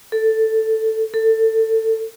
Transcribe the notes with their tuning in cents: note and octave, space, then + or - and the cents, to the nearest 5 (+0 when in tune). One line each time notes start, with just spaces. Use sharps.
A4 +5
A4 +20